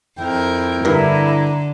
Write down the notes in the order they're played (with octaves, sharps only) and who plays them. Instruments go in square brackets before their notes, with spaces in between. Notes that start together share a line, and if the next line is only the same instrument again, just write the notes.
[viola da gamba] F2 A#4 [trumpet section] E4 G5
[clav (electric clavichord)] G2 A#4 [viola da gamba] D3 [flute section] E4 [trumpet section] A#5